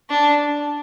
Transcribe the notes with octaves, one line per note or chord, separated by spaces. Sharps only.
D4